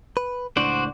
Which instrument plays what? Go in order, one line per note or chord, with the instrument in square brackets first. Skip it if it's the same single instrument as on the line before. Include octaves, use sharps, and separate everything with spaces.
[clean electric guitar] B4
[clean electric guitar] C#2 A2 D4 [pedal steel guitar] F#4 C5 D5